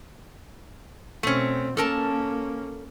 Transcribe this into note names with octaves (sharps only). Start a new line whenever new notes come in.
B2 A3 C4 C#4
A#3 C#4 A4 A#4 A5